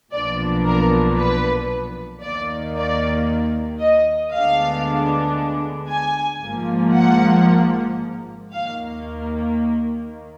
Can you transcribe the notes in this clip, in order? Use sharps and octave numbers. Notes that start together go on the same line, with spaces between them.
B1 A#2 F3 B3 D4 D5
A#4
B4
D#2 D#3 A#3 D5
D5
D#5
D2 D3 G#3 B3 D4 F5
G#5
G#1 G#2 F3 A#3
F#5
D#2 D#3 A#3 F5